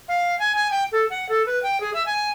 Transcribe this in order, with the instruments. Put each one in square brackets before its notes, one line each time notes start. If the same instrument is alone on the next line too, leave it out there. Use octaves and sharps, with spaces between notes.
[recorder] F5
G#5
G#5
G5
A4
F#5
A4
B4
G5
G#4
E5
G#5